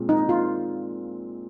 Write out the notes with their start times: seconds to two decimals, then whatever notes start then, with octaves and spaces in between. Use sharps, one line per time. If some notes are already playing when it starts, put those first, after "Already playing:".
Already playing: A#2 G#3 C4 F4
0.09 D#4
0.29 F4